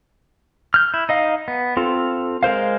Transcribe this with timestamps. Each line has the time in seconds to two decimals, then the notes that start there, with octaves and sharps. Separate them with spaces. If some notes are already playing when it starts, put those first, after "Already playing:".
0.74 F6 G6
0.94 E4
1.09 D#4 D#5 F5
1.48 B3
1.77 C4 F4 A4
2.43 G#3 A#4 C5 F5